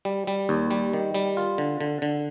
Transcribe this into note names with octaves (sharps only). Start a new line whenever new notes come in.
G3
G3
D#2
G3
D#3
G3
F4
D3
D3
D3